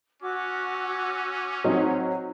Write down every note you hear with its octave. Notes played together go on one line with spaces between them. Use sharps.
C#4 F#4 D6 E6
F#3 C4 D#4 D#5